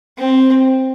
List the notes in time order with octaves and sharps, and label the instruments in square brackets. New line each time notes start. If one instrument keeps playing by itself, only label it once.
[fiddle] C4